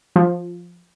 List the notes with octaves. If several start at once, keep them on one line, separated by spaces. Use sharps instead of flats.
F3